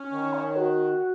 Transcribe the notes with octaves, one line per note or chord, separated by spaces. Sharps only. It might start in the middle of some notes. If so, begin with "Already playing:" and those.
Already playing: C#4
D#3 C#6
C#5
F#4